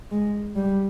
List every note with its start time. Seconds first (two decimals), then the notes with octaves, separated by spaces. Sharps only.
0.11 G#3
0.56 G3